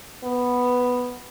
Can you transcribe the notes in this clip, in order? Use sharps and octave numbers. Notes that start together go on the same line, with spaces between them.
B3